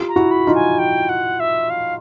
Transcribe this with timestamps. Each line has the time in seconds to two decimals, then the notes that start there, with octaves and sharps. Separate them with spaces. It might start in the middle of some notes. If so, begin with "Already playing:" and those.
Already playing: F4 G4
0.08 A#5
0.16 E4 F#4
0.31 B5
0.47 D#4 F4
0.55 G#5
0.79 G5
1.09 F#5
1.40 E5
1.70 F5